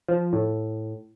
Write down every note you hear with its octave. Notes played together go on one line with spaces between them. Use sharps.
F3
A2